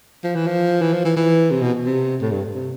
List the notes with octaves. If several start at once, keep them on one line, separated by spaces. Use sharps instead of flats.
F3
E3
F3
E3
F3
E3
E3
C3
B2
C3
A2
G2
C3